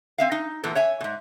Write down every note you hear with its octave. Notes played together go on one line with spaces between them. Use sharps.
C4 E5 F5
D#4
E2 A#2 E3 A3
C#5 E5 G#5
G#2 B2